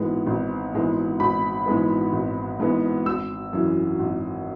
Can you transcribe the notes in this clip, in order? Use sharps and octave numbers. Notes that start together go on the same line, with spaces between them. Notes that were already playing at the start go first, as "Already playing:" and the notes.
Already playing: G#1 G#2 E3 G#3 B3
G#1
G#2 E3 G#3 B3
G#1 B5
G#2 E3 G#3 B3
G#1
G#2 E3 G#3 B3
G#1 E6
F#2 E3
G#1